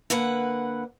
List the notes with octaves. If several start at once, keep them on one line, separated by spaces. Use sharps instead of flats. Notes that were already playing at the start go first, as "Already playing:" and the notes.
D3 A#3 B4 F#5